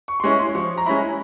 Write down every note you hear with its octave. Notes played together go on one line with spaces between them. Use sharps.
C#6
C6
G#3 C#4 E4 C#6
C6
F3 C#6
A#5
G#3 C#4 E4 B5